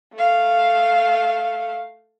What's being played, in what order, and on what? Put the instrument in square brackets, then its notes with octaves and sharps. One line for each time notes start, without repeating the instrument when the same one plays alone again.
[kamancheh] A3 F5